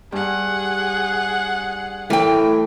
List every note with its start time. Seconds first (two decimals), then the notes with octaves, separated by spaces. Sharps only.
0.12 G2 G#4 F#5
2.10 A2 E3 A3 A#4 G5